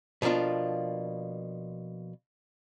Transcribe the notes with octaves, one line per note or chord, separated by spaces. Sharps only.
B2 F3 A#3 D4 F4